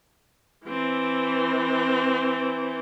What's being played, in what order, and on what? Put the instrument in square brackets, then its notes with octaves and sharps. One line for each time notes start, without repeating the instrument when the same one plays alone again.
[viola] E3 C4